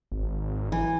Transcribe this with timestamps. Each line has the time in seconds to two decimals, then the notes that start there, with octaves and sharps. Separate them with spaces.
0.12 G#1
0.72 E3